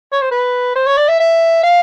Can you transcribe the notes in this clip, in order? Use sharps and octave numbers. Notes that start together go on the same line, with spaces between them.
C#5
C5
B4
C5
C#5
D5
E5
E5
F5